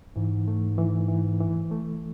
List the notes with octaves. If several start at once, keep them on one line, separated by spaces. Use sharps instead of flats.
G#2 E3
A3
E3
E3
E3
A3